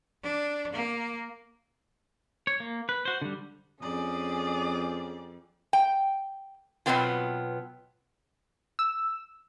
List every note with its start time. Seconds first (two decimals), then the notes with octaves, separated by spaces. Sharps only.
0.22 D4
0.72 A#3
2.47 C#5
2.60 A#3
2.89 B4
3.05 F#4 C5
3.22 D3 G3
3.82 F2 C#4 G#4 D5 D#6
5.73 G5
6.86 B2 D#3 F#3 B3 C4 F4
8.79 E6